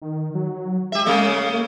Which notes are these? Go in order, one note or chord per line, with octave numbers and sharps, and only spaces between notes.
D#3
F#3
G#3 G4 E5
C#3 A3 C#4
A#3